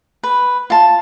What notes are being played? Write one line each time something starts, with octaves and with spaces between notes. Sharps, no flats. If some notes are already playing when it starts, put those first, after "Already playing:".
B4
F4 A5